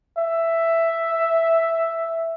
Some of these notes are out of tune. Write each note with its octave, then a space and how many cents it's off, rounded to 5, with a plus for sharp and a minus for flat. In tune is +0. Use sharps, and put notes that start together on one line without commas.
E5 +5